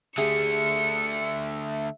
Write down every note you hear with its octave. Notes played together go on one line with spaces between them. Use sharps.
D3 A3 G4 G#4 E5 C#7